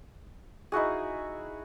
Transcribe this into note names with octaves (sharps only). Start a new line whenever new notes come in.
D#4 E4 F#4 G#4